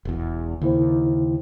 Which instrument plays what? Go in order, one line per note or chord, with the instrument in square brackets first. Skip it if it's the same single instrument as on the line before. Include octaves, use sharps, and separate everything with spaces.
[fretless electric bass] E1 E2
[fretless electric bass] D#2 [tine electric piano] C#3 E4 C5